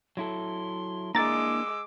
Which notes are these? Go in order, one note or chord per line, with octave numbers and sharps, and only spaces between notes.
F#3 E4 A4 C6
G#3 A#3 D4 E4 A#5 D6 E6 A6